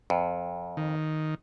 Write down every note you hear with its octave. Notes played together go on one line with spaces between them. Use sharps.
F2
D#3